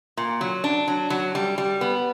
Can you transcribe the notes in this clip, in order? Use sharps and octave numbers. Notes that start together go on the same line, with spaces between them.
A#2
F#3
D4
F#3
F#3
G3
G3
B3